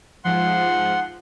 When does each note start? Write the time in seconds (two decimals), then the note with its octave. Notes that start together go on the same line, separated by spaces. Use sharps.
0.25 G#2 F3 F#5 C6